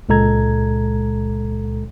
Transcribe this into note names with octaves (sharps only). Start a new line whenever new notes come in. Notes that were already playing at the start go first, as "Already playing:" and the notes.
C#2 A#2 G#3 A4 A#5 G#6